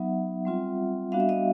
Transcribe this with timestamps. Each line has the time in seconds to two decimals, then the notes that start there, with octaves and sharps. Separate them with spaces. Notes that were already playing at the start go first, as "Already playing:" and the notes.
Already playing: F#3 B3 D#4 E5 F#5
0.45 G3 C4 F4
1.12 G3 B3 D4 F#4 F5
1.20 E5
1.29 D#5 F5